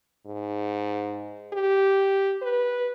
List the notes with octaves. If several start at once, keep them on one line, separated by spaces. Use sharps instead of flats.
G#2
G4
B4